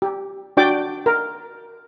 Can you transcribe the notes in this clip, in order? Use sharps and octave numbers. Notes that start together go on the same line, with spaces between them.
G4
D4 F#4 D5 G5 D6
A#4